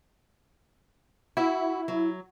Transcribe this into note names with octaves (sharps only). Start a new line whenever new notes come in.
E4 F#4
F#3